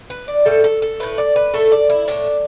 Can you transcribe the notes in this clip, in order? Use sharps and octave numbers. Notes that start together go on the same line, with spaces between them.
B4
D5
A2 G3 A4
A4
A4
A2 A3 B4
D5
B4
A2 A3 A4
D5
E4
A2 A3 D4